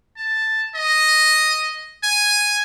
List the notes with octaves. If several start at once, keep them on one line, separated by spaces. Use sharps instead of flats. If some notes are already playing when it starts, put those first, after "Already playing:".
A5
D#5
G#5